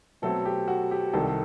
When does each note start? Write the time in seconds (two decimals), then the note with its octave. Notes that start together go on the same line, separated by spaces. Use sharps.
0.22 B2 F#3 A3 C4 A4
0.45 G4
0.68 F#4
0.91 G4
1.13 C2 C3 D#3 A4
1.27 A4